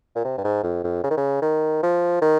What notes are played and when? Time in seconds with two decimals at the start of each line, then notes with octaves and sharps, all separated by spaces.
0.15 A#2
0.25 C3
0.38 G2
0.44 G#2
0.63 F2
0.84 F2
1.04 C#3
1.11 D#3
1.17 C#3
1.42 D#3
1.83 F3
2.22 D#3